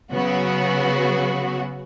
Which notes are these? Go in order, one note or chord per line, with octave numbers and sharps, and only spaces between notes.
C#3 F#3 B3 F#4